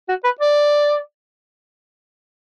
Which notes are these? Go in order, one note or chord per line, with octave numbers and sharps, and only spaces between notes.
F#4
B4
D5